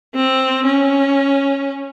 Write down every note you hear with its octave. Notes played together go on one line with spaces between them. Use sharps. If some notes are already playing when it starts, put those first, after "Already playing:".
C4
C#4